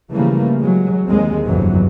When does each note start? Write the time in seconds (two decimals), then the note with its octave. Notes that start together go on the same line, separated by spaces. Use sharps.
0.12 C#3 E3 F3 G3 A3 A#3
0.59 F#3 G#3
1.07 D#2 D3 G#3 C4
1.45 G1 C2 F2 C3 E3 F#3